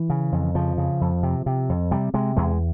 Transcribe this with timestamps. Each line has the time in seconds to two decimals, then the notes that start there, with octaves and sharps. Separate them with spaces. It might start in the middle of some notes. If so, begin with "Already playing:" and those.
Already playing: E3
0.10 C#3
0.32 F2
0.55 C#3 F3
0.78 C#3
1.01 F2
1.23 C3
1.46 C3
1.69 F2
1.91 C3 G3
2.14 C3 G#3
2.37 E2 G#3